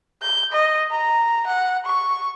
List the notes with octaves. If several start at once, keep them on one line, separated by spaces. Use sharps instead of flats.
G6
D#5
A#5
F#5
C#6